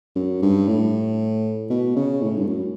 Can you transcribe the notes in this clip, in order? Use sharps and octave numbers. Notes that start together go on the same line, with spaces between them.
F#2
G2
A2
B2
C#3
A2
G2
F#2